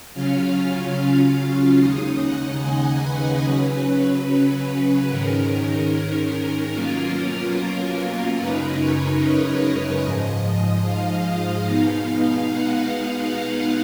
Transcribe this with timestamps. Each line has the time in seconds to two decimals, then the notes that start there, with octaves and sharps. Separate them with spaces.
0.14 C#3 F#3 C#4 F4 F5
1.78 D#2 C#3 G#3 D#4 D#5
2.20 F#5
2.61 G#5
3.02 B4
3.43 C#3 F#3 C#4 B4
5.08 G#2 D#3 G#3 C#4 A#4
6.73 B2 F#3 A#3 C#4 F4
8.38 F#2 C#3 G#3 D#4 B4
8.79 C#5
9.20 D#5
10.02 G#2 F3 G#3
10.84 F5
11.67 B2 G#3 B3 D#4
12.49 F#5